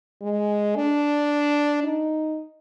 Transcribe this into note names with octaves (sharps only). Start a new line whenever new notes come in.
G#3
D4
D#4